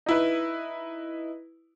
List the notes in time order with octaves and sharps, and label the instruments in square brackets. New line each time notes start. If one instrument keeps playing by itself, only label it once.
[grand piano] D#4 E4 B4